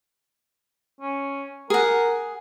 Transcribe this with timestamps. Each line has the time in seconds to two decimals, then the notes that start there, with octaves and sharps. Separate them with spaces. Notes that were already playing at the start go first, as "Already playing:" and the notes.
1.01 C#4
1.70 G#4 A#4 F#5